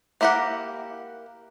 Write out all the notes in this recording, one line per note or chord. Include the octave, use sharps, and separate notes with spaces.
A#3 E4 G4 A#4 F#5